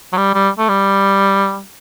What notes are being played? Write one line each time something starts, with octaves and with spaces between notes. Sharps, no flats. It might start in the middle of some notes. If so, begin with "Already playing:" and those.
F#3
G3
G3
A3
G3